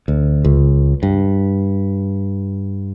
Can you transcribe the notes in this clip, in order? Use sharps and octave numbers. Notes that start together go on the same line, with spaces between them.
D2
C#2
G2